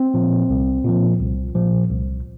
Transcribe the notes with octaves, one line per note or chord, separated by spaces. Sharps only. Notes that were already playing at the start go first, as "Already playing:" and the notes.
Already playing: C4
A#2 F3
C2
A#2 F3
C2
A#2 F3
C2